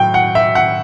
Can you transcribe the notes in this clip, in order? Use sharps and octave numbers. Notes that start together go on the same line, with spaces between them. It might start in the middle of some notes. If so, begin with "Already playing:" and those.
Already playing: A2 F#3 G5
F#5
E5
F#5